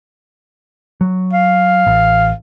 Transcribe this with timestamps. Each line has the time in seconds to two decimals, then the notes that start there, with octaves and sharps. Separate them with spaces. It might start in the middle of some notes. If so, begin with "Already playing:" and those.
1.01 F#3
1.33 F5
1.87 A1